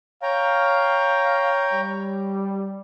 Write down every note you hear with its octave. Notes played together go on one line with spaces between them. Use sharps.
C#5 F5 G5 A#5
G3